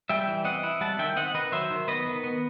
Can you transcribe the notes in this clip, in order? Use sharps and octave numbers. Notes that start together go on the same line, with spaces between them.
G3 E5 G5
E3
C4 D#5 F#5
E4
G3 F#5 A5
D#3 E5 G5
C4 D#5 F#5
D#3 B4 D#5
F#3 C5 E5
D#3
B3 B4 D#5
D#3
B3